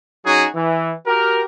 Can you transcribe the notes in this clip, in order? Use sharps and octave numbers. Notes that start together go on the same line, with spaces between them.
F#3 C#4 D#4 F#4 G#4
E3
F#4 G4 A#4